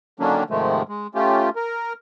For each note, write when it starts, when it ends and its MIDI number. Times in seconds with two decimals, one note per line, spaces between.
0.20 0.44 50
0.20 0.44 51
0.20 0.44 54
0.20 0.44 58
0.20 0.44 61
0.20 0.44 62
0.50 0.82 44
0.50 0.82 48
0.50 0.82 51
0.50 0.82 53
0.50 0.82 56
0.50 0.82 57
0.89 1.07 56
1.15 1.50 57
1.15 1.50 61
1.15 1.50 65
1.15 1.50 67
1.56 1.93 70